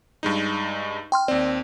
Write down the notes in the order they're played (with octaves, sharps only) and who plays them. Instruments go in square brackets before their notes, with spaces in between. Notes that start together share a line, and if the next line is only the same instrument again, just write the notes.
[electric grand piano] G2 G#3 D#4
[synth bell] G5 C6 F6
[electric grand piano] D#2 C4 [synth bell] D5